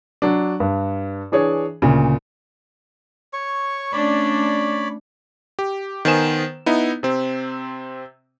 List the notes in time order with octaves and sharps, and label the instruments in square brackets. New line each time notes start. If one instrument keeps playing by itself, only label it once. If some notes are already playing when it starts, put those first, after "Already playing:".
[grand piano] F#3 D4
G2
E3 D4 G#4 C#5
D2 A#2 C#3
[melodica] C#5 C#6
[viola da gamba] A3 C#4 D4 [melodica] C#5 D5 B5
[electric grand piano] G4
D#3 B3 C5 G#5 E7
B3 D#4 E4
C3 C4